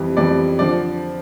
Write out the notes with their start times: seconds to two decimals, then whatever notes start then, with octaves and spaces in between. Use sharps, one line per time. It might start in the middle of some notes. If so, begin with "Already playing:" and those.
Already playing: F2 E3 G3
0.17 F2 E3 G3 D5
0.59 D3 F3 D5